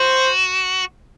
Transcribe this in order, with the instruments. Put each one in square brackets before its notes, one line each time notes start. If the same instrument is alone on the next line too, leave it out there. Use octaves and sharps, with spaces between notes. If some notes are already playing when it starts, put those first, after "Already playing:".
Already playing: [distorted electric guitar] F#4 [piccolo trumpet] C5